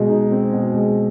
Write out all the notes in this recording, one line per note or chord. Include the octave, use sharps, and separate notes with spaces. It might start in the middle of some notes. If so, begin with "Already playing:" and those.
Already playing: B2 G#3
D#4
C4
B2
G#3